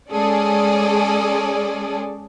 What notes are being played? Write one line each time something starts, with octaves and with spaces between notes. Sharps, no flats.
G#3 C#4 G#4 A4 D5